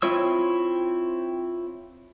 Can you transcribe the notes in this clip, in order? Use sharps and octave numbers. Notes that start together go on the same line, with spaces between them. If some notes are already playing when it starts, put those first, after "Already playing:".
C4 E4 F4 C#5 E6